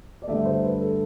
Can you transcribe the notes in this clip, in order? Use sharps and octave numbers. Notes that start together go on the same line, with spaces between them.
D5
G2 D3 A3 E5
C5
B4
A4